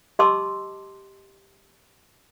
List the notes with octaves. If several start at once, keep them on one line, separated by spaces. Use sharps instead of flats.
G4 D#5 A5 C6 D6 E6